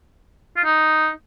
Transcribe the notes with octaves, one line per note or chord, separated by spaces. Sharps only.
F4
D#4